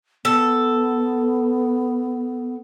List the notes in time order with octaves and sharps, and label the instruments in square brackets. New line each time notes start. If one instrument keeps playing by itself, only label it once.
[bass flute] B3 [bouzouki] A4